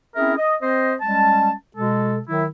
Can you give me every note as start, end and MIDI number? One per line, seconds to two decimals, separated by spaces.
0.16 0.36 60
0.16 0.36 61
0.16 0.36 64
0.16 0.36 68
0.16 0.36 70
0.16 0.36 76
0.37 0.54 75
0.61 0.94 60
0.61 0.94 72
0.61 0.94 75
1.01 1.52 55
1.01 1.52 56
1.01 1.52 61
1.01 1.52 81
1.77 2.18 47
1.77 2.18 56
1.77 2.18 69
2.29 2.45 51
2.29 2.45 54
2.29 2.45 64